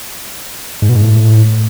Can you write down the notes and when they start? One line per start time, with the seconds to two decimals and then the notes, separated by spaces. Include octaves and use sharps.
0.82 G#2
0.89 B2
0.96 G#2
1.03 A2